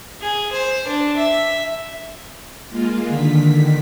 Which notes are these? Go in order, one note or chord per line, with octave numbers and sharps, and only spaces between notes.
G#4
C5
D4
E5
G#3 A#3 F4
D3 D#3 B6